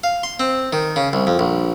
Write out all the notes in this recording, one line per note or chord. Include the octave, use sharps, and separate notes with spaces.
F5
C6
C4
D#3
C#3
C2
F2
A#1